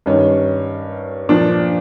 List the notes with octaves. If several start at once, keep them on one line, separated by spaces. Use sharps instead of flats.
G2 D#3 C#4
A#2 F3 D4